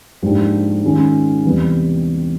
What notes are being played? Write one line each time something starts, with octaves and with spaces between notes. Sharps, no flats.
G#2 F3 A#3 D4 G4
D#3 G#3 C#4 F4
E2 C3 E3 G3 B3